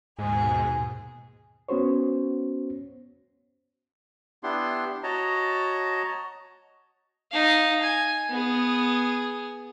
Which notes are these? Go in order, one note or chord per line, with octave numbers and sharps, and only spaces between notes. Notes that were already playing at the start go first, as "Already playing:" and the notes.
D#2 G#2 B2 G#4
B3 C#4 F#4 C5 C#5
B3 D4 E4 G4 C6
F#4 C#5 D#5 A5 A#5
D#4 F5
G#5
B3 G#4